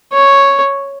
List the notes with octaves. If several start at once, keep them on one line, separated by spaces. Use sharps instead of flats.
C#5